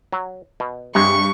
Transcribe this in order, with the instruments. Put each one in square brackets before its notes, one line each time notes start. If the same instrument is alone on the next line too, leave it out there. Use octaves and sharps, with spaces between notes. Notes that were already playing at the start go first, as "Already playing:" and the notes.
[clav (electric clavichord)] F#3
B2
[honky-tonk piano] G2 [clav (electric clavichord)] C3 G#3 [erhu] C#6